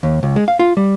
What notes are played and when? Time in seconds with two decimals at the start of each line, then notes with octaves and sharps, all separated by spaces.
0.03 D#2
0.23 C#2
0.36 G#3
0.48 F5
0.59 F4
0.77 G3